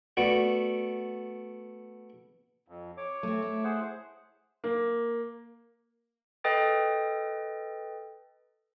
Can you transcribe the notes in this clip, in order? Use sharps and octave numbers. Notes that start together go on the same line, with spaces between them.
A3 B3 F#4 D5
F2
C#5 D6
A3 C4
E4
G#4 C5 F#5
A#3
A4 B4 D#5 G5 D#6 A6